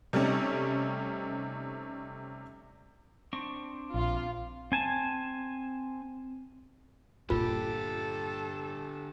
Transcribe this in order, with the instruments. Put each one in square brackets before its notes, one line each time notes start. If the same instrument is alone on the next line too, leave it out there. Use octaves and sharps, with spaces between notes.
[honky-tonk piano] C3 G3 A3 C4 C#4 D#4
[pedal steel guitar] C4 D4 C#6
[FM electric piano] A#1 [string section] F4
[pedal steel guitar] C4 G#5 A5
[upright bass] G2 A#2 [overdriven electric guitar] D3 G4 [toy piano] F4 [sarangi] A4